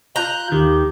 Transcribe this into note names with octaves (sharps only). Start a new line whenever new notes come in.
F4 A#5 F#6 G6
D#2 D#3 G4